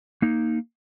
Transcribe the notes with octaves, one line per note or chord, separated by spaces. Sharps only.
A#3 D#4